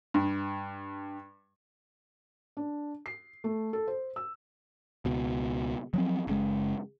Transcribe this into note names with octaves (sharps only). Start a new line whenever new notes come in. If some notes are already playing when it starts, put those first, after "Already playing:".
G2
D4
C7
A3
A4
C5
E6
C#2 B2
F3 F#3 C4
F#1 C#3 G#3